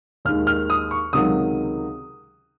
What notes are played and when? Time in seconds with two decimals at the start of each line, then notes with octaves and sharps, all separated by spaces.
0.25 D#2 D#3 G#3 F6
0.47 F6
0.70 D#6
0.91 C#6
1.13 C#2 C3 D#3 F#3 D#6